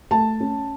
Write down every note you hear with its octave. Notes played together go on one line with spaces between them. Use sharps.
A3 A5
C#4